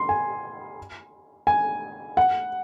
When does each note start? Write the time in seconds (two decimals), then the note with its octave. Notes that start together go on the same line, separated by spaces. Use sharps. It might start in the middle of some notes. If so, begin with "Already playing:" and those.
Already playing: C6
0.09 G#5
1.47 G#5
2.17 F#5